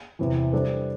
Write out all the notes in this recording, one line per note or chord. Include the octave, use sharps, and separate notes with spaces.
E2 C3 E3
G3 D4 A4 C5